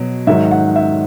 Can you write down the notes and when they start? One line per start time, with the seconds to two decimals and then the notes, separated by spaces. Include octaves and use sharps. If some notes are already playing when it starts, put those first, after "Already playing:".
Already playing: B2 F#3
0.27 G#2 D#3 F#3 E5
0.51 F#5
0.76 E5